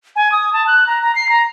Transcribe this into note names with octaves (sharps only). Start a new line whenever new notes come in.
G#5
D#6
A5
F#6
A#5
A#5
C7
A#5